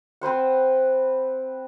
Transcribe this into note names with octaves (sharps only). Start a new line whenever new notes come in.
C4 B4 C5 F#5